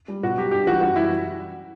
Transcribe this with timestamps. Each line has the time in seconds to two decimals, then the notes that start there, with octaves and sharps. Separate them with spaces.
0.08 G3
0.23 B2 F#4
0.38 F#3 G4
0.51 G2 G4
0.66 E3 G3 F#4
0.81 F#2 F#4
0.95 E3 G3 E4